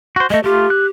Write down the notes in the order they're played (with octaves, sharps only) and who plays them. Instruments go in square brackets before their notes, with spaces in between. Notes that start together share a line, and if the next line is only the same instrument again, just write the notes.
[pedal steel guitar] F#4 C5
[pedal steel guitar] G#3 A3 [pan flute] D#5
[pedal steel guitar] A3 F4 [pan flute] G4
[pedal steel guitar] F#6